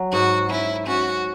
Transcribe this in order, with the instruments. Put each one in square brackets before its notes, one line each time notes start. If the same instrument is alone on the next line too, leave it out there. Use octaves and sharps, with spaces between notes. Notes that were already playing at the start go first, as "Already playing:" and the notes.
Already playing: [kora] F#3
[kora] G#2 [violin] F#4
[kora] C#4 [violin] E4
[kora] C#4 [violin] F#4